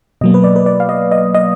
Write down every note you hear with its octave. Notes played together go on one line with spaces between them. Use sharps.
B2 F#3 A#3 D#5
B4
D5
B4
D5
F5
D#5
D#5
D#5